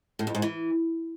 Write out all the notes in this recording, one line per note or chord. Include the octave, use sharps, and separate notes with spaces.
A2
F2
G#2
E3